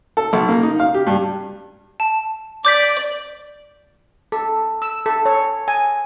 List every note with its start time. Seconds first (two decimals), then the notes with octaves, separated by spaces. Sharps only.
0.17 A4
0.33 B1
0.49 A#3
0.63 D#4
0.80 F5
0.94 G4
1.07 G2
2.00 A5
2.65 D5 D6 G6 B6
4.32 A4
4.82 E6
5.06 A4
5.25 C#5
5.68 G#5